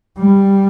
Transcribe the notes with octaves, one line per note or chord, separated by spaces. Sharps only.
G3